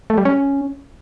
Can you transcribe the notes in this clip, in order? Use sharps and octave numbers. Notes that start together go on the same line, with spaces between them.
A3
G3
C#4